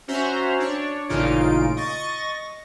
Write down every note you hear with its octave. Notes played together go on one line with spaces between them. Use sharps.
C#4 F#4 C5 E5 A#5
D4 C#5
A1 A#2 C#3 D#4 F4 D7
D#5 C#6 A6 A#6